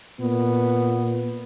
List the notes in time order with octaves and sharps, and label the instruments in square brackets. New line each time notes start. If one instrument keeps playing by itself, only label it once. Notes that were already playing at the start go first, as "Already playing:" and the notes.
[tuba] A#2 [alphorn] B3